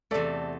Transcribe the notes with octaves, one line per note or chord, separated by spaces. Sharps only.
E2 C3 A3 A4 D5